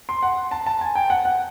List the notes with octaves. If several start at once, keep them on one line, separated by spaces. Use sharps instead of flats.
C6
F#5
A5
A5
G#5
G5
F#5
F#5